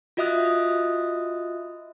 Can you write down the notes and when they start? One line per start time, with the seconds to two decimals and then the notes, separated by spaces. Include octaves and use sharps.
0.17 F4 F#4 D#5 E5 D#6 F#6